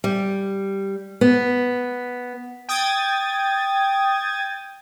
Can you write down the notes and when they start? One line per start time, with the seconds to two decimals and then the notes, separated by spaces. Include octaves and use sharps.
0.04 G3
1.21 B3
2.69 G5 D#6 G#6 A6